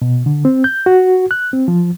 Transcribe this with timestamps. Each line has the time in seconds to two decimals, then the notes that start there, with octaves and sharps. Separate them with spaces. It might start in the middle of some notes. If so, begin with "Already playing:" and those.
0.02 B2
0.26 D3
0.45 C4
0.64 G6
0.86 F#4
1.31 F#6
1.53 C4
1.68 F3